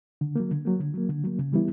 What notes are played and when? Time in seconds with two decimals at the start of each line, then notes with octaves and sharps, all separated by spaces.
0.21 D3
0.36 F#3 A#3
0.51 D3
0.65 F#3 A#3
0.80 D3
0.94 F#3 A#3
1.09 D3
1.24 F#3 A#3
1.39 C#3
1.52 E3 G3 B3 E4